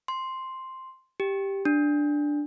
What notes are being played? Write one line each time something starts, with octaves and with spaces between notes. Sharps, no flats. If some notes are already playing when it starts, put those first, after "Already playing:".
C6
G4
D4